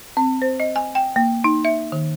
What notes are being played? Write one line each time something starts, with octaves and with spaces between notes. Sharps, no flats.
C4
C5
D#5
G#5
G5
A#3
D#4
E5
D#3